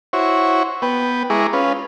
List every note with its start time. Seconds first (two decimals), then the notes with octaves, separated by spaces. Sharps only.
0.13 E4 F#4 C5 C#5 C#6
0.82 B3 B4 G5
1.30 G#3 E4 G#4 A#5 C#6 D6
1.53 C#4 F4 B4